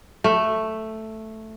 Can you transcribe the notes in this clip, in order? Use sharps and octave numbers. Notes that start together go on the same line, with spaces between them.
A3